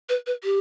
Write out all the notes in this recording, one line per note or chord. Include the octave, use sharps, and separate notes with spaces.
B4
B4
G4